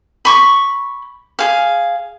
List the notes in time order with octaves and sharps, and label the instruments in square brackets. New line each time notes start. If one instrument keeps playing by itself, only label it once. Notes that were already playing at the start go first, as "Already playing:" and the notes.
[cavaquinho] B5 C#6 D6
G#4 F5